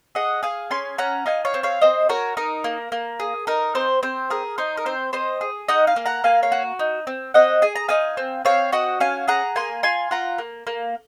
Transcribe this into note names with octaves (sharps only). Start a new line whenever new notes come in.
G#4 D#5 F#5
G#4 F5 G#5
C#4 G#5 C6
C#4 F#5 A#5
D#4 F5 G#5
C#5 F5
C4
C#5 F5
C4 C5 D#5
F#4 A#4 C#5
D#4 A#4
A#3
A#3
G#4
D#4 A#4
C4 C5
C4 C5
G#4 A#4
D#4 C5
A#4
C4 C5
C4 C5 D#5
G#4
D#4 D#5 F#5
F5 G#5
A#3
F#5 A#5
A#3 F5 G#5
C#5 F5
F#4
D#4
C4
C4 D#5 F#5
G#4 G#5
A#5
D#4 F5 G#5
C4
C4 C#5 F5
F#4 D#5 F#5
C#4 F5 G#5
G#4 F#5 A#5
A#3 G#5 C6
F4 G#5 C6
F4 F#5 A#5
A#3
A#3